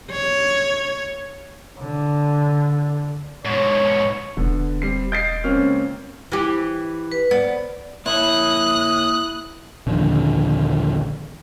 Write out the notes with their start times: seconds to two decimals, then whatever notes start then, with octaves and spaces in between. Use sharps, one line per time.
0.11 C#5
1.78 D3
3.45 G#2 B2 C#5
4.37 E1 D3 B3
4.82 G3 C4 C7
5.12 D#5 G6 A6 C7 D7
5.44 C#2 A#3 C4 C#4 F6
6.32 E3 G4
7.12 B4
7.31 B3 D5
8.06 A#3 E4 C#5 D#6 F#6
9.87 A#1 D#2 D3